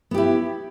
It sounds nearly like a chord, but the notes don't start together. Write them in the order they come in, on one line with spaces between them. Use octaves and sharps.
B3 G4 E4